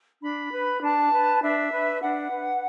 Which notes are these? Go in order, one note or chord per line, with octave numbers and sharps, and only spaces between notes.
D4 B5
B4
D4 A5
B4
D4 E5
B4
D4 F#5
B4